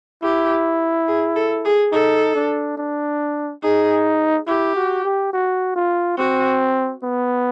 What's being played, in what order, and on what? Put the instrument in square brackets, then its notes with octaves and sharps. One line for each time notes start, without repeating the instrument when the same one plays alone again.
[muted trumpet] E4 [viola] G4
[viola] G#4
A4
G#4
[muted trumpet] D#4 [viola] A4
[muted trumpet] D4
D4
[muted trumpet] D#4 [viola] G#4
[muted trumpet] E4 [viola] G4
[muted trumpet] F#4
G4
F#4
F4
[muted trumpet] C4 [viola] F#4
[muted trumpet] B3